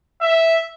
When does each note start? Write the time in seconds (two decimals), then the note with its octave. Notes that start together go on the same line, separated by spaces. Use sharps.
0.22 E5